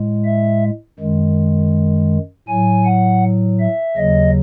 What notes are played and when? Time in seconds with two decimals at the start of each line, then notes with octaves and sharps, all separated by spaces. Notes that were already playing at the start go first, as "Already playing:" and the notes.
Already playing: A2 G#3
0.25 E5
1.00 F#2 D#3 G#3
2.48 A2 F#3 G#5
2.85 F#5
3.60 E5
3.97 D#2 C#3 F#3 D#5